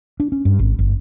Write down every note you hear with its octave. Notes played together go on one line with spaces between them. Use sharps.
D4
C#4
G2
G#1
G1